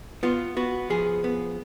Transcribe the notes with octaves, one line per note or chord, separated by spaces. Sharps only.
B3 F4
B3 F#4
F3 G#4
B3